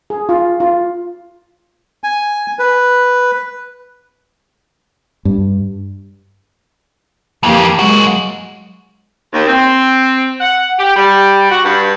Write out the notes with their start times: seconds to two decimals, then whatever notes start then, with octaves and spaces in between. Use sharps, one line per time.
0.10 G#4
0.29 F4
0.60 F4
2.04 G#5
2.59 B4
5.25 G2
7.43 F2 E3 A#3 G4
7.79 F#3 G#3 A#3 F#4
9.33 D#2
9.47 C4
10.40 F#5
10.79 G4
10.96 G3
11.50 F#4
11.64 G2